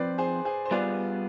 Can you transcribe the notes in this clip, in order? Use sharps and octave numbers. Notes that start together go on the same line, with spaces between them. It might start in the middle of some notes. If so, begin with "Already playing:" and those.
Already playing: F3 C4 F4 B4 D5
G#4 C5
G#4 C5
C5
G3 B3 F4 G#4 B4 D5